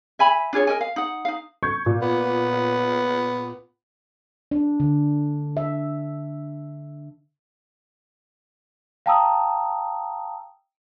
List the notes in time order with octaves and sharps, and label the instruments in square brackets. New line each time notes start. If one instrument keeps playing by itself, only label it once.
[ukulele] E5 G#5 B5
D4 F4 G#4 C#5
A#4 D#5 G#5
F5
D#4 F#5
D#4 F5
[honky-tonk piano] C#6 G6 G#6
A#2
[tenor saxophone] B3
[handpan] D4
D3
E5
[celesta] F5 G5 A5 A#5 D#6 E6